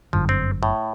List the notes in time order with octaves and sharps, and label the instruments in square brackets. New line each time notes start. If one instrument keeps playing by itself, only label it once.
[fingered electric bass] G1 F#2 D3 [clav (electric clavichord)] F3
[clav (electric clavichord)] C4
A2